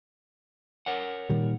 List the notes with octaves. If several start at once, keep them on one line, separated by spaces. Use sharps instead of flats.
A#4 C#5 F#5
A#2 D#3 G3